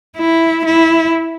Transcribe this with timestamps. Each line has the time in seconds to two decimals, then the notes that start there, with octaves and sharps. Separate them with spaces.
0.17 E4
0.65 E4